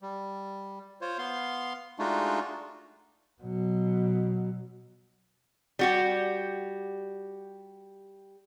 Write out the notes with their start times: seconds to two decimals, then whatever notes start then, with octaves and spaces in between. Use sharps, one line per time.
0.02 G3
1.01 F4 C5 C#5
1.18 B3 F5 C6
1.99 G#3 A3 D4 D#4 F4 F#4
3.42 B2 F#3
5.79 G3 F#4 G4